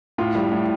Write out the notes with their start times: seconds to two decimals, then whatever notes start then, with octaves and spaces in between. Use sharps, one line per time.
0.18 A2 F4
0.35 G3
0.52 A2